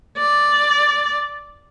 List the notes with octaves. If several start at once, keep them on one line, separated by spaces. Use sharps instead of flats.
D5